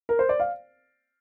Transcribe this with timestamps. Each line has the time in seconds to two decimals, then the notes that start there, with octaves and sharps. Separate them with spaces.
0.09 A#4
0.19 C5
0.29 D5
0.40 F5